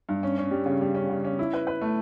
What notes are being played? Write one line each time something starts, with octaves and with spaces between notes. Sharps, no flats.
G2
C#4
C#4
G3
C#3
G3
C#4
C#3
C#4
E4
B4
B4
A3